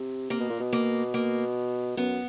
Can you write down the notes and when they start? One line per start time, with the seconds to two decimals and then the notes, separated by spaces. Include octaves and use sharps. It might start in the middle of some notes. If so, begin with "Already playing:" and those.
Already playing: C3
0.30 C3 A#3
0.40 B2
0.50 A#2
0.60 B2
0.73 A#3
1.14 A#3
1.97 F#2 B3